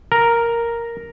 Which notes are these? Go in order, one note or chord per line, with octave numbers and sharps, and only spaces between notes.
A#4